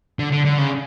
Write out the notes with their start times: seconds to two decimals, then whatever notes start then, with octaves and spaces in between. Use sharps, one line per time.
0.19 D3
0.32 D3
0.45 D3
0.58 C#3